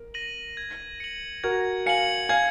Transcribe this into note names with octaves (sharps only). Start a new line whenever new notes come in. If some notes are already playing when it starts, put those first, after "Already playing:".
Already playing: A#4
A#6 D#7 F#7
G#6
C#7 F#7
F#4 A#4 G#6
F5 G#5 C#7 F#7
F5 G#5 G#6